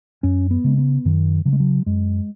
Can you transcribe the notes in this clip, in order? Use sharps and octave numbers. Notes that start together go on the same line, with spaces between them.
F#2 C#4
B3
C#3 G#3
B3
F#2 D#3
C#3 F#3
G#3
F#3
F#2 G#3